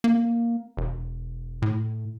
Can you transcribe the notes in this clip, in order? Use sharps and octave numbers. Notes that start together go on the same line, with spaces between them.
A#3
E1
A2